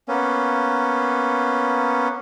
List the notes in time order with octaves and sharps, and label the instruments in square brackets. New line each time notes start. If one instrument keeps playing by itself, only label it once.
[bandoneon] A#3 B3 C#4